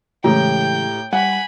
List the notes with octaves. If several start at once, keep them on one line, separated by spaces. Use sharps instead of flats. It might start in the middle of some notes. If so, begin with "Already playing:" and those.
A2 C#3 E3 G#3 G4 G5 A#5 G6
G3 F#5 G#5 B5